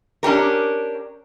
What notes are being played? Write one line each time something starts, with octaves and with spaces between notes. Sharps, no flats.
C#4 D4 G4 A#4